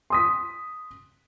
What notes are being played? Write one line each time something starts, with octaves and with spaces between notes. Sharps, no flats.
C6 D#6 B6